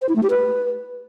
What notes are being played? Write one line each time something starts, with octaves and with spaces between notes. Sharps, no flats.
C5
E4
A3
G4
B4